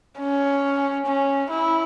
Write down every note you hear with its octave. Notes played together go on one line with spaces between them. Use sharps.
C#4
C#4
E4